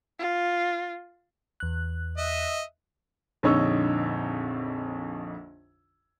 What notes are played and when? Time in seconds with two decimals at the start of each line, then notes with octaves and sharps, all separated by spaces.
0.19 F4
1.60 E2 F#6
2.18 D#5 E5
3.43 A#1 F2 D3 D#4 C#5 E6